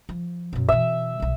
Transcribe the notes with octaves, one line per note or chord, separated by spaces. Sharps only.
F3
F#2 B2
B2 E3 E5
B1 D#3